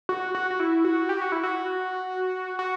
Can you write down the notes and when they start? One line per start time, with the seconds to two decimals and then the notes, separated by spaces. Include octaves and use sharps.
0.09 F#4
0.35 F#4
0.51 F#4
0.60 E4
0.85 F#4
1.09 G4
1.21 F#4
1.32 E4
1.43 F#4
2.59 F#4